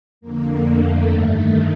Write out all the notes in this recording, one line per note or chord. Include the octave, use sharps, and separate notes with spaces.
F2 D3 A#3
A3
G2 D#3 A3